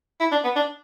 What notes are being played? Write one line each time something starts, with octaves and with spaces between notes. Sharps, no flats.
E4
D4
B3
D4